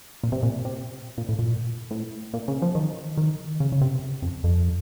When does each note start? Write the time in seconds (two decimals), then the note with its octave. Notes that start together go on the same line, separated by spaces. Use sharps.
0.23 A#2
0.32 C3
0.43 A#2
0.65 C3
1.18 A#2
1.29 A2
1.39 A#2
1.91 A2
2.34 A#2
2.48 C#3
2.62 F3
2.75 D#3
3.17 D#3
3.60 C#3
3.72 C#3
3.81 C3
4.22 F2
4.44 F2